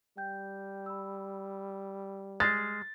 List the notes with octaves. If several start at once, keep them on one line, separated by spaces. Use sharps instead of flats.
G3 G5 G6
B5 E6
G#3 F6 A6 C7